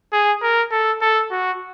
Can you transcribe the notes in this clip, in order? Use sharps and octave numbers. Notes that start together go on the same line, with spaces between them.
G#4
A#4
A4
A4
F#4